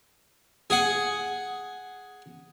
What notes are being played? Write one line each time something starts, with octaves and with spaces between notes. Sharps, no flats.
G#4 F#5